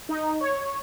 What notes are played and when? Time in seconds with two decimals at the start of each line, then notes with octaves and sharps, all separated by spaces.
0.09 D#4
0.41 C#5